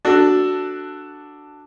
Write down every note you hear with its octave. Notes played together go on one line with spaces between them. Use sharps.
D4 F#4 A4